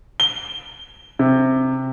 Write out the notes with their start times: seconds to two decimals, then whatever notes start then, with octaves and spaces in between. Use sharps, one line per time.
0.20 G7
1.19 C3